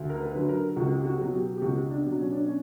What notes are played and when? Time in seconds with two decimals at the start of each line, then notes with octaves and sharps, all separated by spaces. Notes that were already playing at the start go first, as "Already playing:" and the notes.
Already playing: D2
0.10 A#4
0.20 B4
0.34 D3 F#3
0.49 A#4
0.76 C#2 F#4
0.95 G4
1.05 F#4
1.20 B2 F#3
1.33 G4
1.57 G4
1.62 C#2 F#4
1.90 D4
2.05 B2 F#3
2.18 C#4
2.32 D4
2.45 C#4